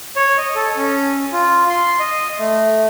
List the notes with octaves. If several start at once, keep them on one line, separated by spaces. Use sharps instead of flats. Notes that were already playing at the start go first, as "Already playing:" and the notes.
C#5
D#5
A4
C#4
F4
C6
D#5
A3